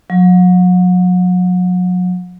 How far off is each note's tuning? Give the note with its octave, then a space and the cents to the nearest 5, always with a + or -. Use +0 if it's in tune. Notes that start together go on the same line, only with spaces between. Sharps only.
F#3 -40